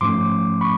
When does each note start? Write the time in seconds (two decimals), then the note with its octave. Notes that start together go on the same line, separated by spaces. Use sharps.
0.01 G#2 F3 A3 C#4 C6 D6
0.61 B5 C#6